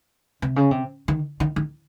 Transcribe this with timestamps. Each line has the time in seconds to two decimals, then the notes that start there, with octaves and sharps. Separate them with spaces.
0.42 C3
0.56 C#3
0.71 C3
1.08 D#3
1.40 D#3
1.56 D#3